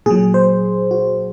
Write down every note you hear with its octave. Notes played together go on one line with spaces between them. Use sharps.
A#2 F#3 G#4
C5
F#4